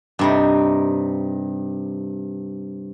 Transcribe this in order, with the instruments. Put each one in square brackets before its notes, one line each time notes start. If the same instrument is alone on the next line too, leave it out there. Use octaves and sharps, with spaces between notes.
[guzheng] G2 C3 D#4